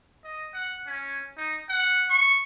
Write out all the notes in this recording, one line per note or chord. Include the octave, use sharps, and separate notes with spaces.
D#5
F#5
C#4
D#4
F#5
C#6